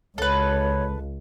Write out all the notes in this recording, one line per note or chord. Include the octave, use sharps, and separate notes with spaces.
C#2 A4 B4 C#5